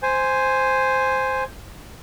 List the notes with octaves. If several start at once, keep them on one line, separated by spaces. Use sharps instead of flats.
C5 G#5